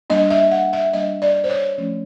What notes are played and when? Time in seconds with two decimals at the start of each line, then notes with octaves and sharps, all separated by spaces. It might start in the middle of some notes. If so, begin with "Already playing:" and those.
0.10 G3 A#3 D4 D#5
0.30 E5
0.51 F#5
0.73 E5
0.93 G3 A#3 D4 D#5
1.22 D5
1.44 C5
1.50 C#5
1.78 F3 A3 C#4